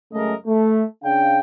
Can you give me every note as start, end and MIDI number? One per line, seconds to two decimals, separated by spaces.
0.13 0.34 42
0.13 0.34 49
0.13 0.34 56
0.13 0.34 57
0.13 0.34 70
0.13 0.34 75
0.46 0.83 57
1.04 1.40 49
1.04 1.40 62
1.04 1.40 77
1.04 1.40 79